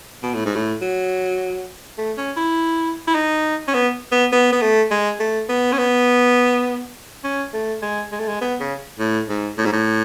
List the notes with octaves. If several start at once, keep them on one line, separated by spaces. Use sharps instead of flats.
B2
A2
G#2
A2
F#3
A3
C#4
E4
E4
D#4
C#4
B3
B3
B3
B3
A3
G#3
A3
B3
C#4
B3
C#4
A3
G#3
G#3
A3
G#3
B3
C#3
A2
G#2
A2
G#2
A2